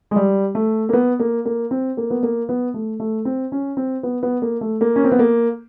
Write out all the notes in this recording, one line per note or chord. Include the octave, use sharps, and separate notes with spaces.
G#3
G3
A3
A#3
B3
A#3
A#3
C4
A#3
B3
A#3
B3
A3
A3
C4
C#4
C4
B3
B3
A#3
A3
A#3
C#4
C4
B3
A#3